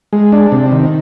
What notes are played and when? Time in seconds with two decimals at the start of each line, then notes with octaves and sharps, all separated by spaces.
0.13 G#3
0.32 D4
0.52 C3
0.72 D#3